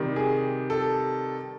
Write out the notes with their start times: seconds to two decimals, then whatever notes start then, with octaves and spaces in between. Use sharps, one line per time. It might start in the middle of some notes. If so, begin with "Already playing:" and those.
Already playing: C3 D#3 G3
0.16 G#4
0.70 A4